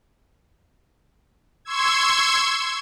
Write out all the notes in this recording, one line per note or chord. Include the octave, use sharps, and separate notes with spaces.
C6 C#6 E6 G#6